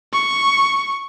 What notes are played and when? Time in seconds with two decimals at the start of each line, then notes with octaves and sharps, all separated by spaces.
0.13 C#6